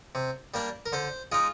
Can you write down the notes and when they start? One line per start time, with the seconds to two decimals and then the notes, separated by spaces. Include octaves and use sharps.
0.15 C3
0.54 G3 A#3 D4
0.86 A#4
0.92 D3 C5
1.32 G#3 D#4 F4